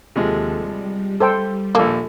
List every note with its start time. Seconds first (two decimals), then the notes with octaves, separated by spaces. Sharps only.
0.16 D#2 C3 F3 G#3 A4
0.56 G3
1.20 A4 C5 G5
1.75 A#1 D#2 A#3 A4